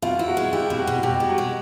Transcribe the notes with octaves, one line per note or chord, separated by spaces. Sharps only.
B2 F4 F5
E4
F#4 F#5
G#3
E4 G4 G5
B2 G5
F#4 F#5
B2
B2 G4 G5
G#3
F#4 F#5
G#3